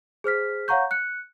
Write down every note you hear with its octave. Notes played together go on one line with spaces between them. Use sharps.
G#4 C5 F6 B6
C#5 F5 F#5 A#5 C#6 G6
F#6 C#7